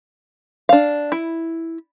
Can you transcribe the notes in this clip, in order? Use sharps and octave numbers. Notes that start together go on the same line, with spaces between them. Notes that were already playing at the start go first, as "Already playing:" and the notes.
D4 F5
E4